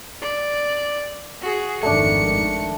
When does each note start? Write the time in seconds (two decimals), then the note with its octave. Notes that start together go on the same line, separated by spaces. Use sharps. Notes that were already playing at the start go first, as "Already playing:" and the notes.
0.22 D5
1.41 F#4 G#4
1.83 G#1 F2 D#3 A3 D4 C#7